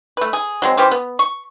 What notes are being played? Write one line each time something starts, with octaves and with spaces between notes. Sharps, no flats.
A3 B4
G#4
F#3 G#3 C4
E3 C#4 G4 C5
B3
C#6